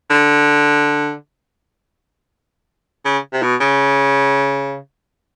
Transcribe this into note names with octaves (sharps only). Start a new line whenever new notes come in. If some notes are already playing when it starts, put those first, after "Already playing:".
D3
C#3
C3
B2
C#3